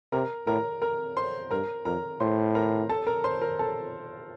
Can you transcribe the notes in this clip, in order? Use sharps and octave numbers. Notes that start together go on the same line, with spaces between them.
C3 A#4 A#5
A2 A#4 A#5
A#4 A#5
C5 C6
G2 A#4 A#5
F2 A#4 A#5
A2 C5 C6
A#4 A#5
A4 A5
A#4 A#5
C5 C6
A#4 A#5
A4 A5